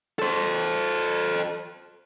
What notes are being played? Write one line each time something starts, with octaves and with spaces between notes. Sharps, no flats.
A4 C5